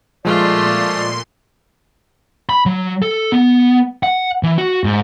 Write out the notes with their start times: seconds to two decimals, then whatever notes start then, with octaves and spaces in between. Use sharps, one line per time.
0.25 A#2 F3 G#3 A3 F4 D5 C6
2.49 B5
2.66 F#3
3.02 A4
3.32 B3
4.03 F#5
4.43 E3
4.58 F#4
4.84 G#2